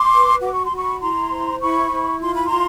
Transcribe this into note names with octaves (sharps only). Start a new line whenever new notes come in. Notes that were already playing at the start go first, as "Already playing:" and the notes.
Already playing: C6 D6
B4
F#4 D6
C#6
C6
F#4 B5 C#6
E4 A#5 C6
C5
E4 B5 C#6
E4
F4 C6
B5
A#5 C6
F4